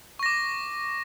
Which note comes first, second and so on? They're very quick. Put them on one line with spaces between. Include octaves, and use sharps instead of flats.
C#6 A#6 D6